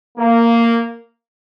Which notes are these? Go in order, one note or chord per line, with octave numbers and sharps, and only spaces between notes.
A#3